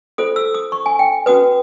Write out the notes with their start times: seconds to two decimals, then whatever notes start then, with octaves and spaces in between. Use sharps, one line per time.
0.18 F4 A4 C5 D#6
0.36 E6
0.54 D#6
0.72 C#6
0.86 G#5
0.99 G5
1.26 C#4 F#4 B4 D#6